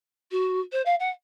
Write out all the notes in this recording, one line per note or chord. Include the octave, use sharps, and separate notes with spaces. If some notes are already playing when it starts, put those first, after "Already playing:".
F#4
C5
F5
F#5